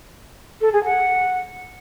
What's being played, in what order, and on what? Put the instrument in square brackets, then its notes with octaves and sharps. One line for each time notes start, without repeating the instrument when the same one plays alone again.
[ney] A4
G#4
F#5